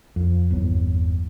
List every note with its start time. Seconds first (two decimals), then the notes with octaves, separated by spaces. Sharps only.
0.16 F2
0.51 G1 E2 F#3